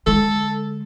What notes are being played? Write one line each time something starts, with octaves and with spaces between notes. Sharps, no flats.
D3 G#3 A4